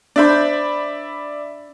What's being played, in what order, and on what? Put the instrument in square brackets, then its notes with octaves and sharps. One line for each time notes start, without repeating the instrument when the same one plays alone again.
[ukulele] D4 C5 [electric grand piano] D5 E5 B5